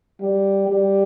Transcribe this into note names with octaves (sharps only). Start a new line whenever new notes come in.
G3
G3